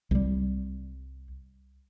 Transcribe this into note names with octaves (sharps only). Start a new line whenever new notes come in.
C2 G3